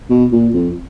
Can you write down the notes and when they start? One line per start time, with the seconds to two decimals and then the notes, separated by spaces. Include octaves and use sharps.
0.10 B2
0.32 A#2
0.54 F2